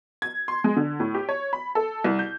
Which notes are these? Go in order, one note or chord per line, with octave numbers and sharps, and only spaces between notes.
G#6
C6
G#3
D3
A2
G4
C#5
B5
A4
C2
G6